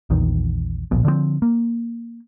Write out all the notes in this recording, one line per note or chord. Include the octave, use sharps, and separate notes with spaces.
A#1 E2 D#3
D1 A#1 B2
D3 F3 G3 C4
A#3